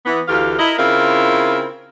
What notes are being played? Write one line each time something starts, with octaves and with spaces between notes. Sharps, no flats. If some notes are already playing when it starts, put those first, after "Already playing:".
E3 B3
D2 E3 A3 F4 G4 F5
E4 A#4 D#5
C#3 C4 E4 F4 A#4